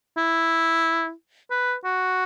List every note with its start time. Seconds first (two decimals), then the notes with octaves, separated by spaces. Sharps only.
0.17 E4
1.51 B4
1.85 F#4